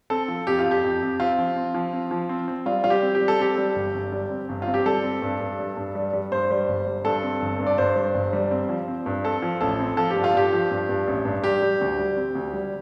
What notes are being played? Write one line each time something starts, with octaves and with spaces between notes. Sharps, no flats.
C4 A4
F3
F2 G4
F4
F2
G4
F2
F2
C4 F4
F3
C4
F3
C4
F3
C4
C4
G3 F4
G3 F4
G4
C4
G4
G3
A4
C4 G4
G3
G1
G1
G3
C4
G1
F4
C4
G4
G3 A4
C4
G2
G2
G3
G2
G3
G3
G2 C5
G3
G1
G3
G2 A4
C4
G1
G2
D5
G2 C5
G3
G1
G3
C4
F3
C4
G2
C4 A4
F3
A1 A4
C4
F3 A4
G4
G2
F4
G2 G4
F3
G2
G2
A1
G2
G3 G4
G3
D2
G3
C4
D2
G3